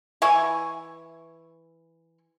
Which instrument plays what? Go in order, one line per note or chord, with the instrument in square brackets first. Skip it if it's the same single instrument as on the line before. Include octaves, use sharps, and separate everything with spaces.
[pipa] E3 E4 G#5 C#6